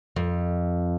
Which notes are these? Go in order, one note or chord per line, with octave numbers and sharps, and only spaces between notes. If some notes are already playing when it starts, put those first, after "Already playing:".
F2